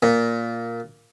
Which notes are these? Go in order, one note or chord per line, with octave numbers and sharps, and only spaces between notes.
A#2